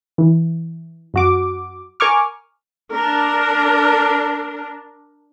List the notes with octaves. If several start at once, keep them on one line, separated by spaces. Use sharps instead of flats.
E3
F#2 F#4 D6
A#4 G#5 C#6 D6 F6
D4 A#4